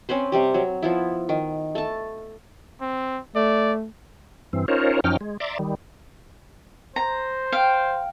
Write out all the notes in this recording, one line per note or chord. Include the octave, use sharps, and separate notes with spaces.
C4 C#4 B4 C5
C3 G3 G4
F#3
F3 B3 E4
D#3
A3 A5
C4
A3 D5
G2 E3 C4
C#4 D#4 F4 A#4 C5 C#5
F#2 F3 C#4 D#4 G5 F6
G#3
D5 E5 A#5 C6 D6
D#3 G3
C5 A#5
F5 G5